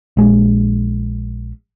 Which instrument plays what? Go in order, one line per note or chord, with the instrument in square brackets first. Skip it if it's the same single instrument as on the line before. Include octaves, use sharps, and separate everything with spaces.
[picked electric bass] A#1 G#3